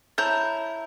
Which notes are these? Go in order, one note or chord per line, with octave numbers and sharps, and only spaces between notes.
E4 C#5 A5 A#5 G6